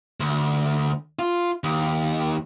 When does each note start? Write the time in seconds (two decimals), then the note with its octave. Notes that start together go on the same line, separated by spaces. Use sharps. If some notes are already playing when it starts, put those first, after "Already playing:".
0.20 D2
1.19 F4
1.64 D#2